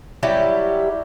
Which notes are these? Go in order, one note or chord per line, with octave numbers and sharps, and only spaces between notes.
F#3 G3 E4 G4